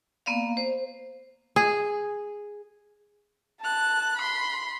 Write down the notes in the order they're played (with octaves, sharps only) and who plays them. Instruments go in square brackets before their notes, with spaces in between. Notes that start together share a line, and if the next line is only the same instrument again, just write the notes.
[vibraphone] A#3 B3 D5 F5
C5
[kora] G#4
[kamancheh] A5 F#6
B5 C6